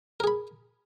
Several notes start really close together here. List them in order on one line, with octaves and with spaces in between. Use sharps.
A#4 G#4 B5